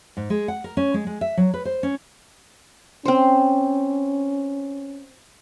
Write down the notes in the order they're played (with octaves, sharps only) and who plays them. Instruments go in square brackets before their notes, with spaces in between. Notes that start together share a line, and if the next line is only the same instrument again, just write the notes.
[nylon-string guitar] G#2
G#3
F#5
A#4
C#4
G#3
G#3
E5
F#3
B4
C5
C#4
[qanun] C4 C5 [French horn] C#4